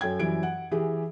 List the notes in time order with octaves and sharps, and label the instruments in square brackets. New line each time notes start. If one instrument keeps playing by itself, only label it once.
[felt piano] F#2 A4 G5 G#6
F#2 E3 G3 D7
F#5
E3 G4 G#4